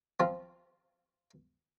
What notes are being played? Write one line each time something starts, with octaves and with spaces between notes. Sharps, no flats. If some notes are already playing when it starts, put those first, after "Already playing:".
F3 C4 F4